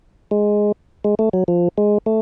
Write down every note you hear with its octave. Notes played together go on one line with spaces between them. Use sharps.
G#3
G#3
A3
F#3
F3
G#3
A3